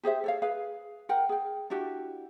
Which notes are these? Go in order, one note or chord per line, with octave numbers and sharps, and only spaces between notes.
G4 G#4 C5 E5
A4 C#5 F5
G#4 B4 F5
A#4 F#5 G5
G#4 G5
D4 E4 F#4 G4